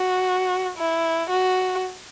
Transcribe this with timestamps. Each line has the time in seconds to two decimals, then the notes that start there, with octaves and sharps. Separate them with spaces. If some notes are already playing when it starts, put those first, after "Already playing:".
Already playing: F#4
0.78 E4
1.30 F#4